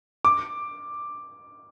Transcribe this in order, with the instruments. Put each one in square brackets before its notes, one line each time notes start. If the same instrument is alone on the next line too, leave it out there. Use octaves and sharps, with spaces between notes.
[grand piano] D6